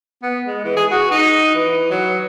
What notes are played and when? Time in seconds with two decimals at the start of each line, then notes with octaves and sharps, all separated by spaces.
0.23 B3
0.47 G#3
0.64 E3
0.76 G#4
0.91 F#4
1.11 D#4
1.55 E3
1.91 F#3